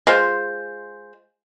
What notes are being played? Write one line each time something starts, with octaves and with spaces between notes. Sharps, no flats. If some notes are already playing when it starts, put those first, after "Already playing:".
G#3 F4 C5